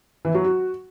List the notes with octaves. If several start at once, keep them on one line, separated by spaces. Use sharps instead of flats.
E3
F#3
F#4